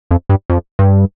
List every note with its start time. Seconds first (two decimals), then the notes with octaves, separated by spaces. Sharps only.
0.11 F2
0.29 G2
0.50 F2
0.79 G2